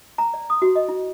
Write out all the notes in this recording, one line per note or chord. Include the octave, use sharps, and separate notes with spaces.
A#5
D5
D#6
F#4
D#5
E4